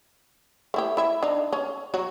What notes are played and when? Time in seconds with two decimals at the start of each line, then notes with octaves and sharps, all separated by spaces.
0.74 A3 E4 G4
0.97 E4 E5
1.23 D4 D#4
1.53 C#4
1.94 F#3 F#4 C#5